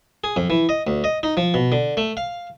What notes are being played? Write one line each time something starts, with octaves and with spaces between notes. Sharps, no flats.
G#4
F2
E3
D#5
D2
D#5
D#4
F3
B2
D3
A3
F5